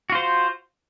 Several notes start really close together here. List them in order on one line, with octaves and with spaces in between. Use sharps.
F#4 F4 C5